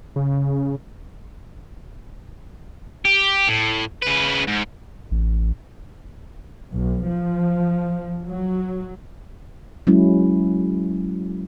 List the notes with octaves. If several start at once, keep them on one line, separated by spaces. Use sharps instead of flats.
C#3
G4
A2
C#3 B4
G#2
A1
B1
F3
F#3
F#3 G#3 C#4 E4